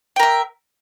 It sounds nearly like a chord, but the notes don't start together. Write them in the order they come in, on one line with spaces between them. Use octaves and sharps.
G5 A#4 E5